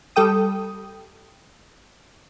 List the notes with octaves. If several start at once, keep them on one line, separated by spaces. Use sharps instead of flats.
G3 A4 G5 D#6